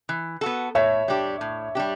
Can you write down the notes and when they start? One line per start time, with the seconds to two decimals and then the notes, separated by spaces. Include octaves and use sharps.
0.09 E3
0.41 B3 F#4 A4
0.75 A2 C#5 E5
1.08 G3 D4 G4
1.41 A2
1.75 G3 D4 G4